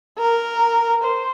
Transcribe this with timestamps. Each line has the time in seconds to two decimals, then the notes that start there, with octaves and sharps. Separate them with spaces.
0.18 A#4
1.03 C5